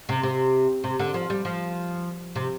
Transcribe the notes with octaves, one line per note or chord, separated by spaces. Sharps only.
C3
C3
C3
D3
F3
G3
F3
C3